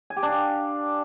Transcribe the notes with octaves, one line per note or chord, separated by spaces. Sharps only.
G#5
G4
D4
F5